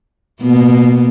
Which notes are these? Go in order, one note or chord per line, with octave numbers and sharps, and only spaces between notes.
B2 A#3 B3